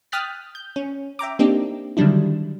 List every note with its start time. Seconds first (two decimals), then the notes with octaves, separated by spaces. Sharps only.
0.12 G5 D#6 F6 F#6 A6 B6
0.55 G6
0.76 C#4
1.19 E5 G5 A#5 D6
1.39 A#3 C4 D4 D#4 G4
1.97 D3 D#3 F#3 G3 D4 E4